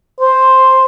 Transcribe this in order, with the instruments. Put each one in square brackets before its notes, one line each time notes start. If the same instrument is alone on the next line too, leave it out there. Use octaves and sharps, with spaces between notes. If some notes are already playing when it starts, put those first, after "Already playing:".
[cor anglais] C5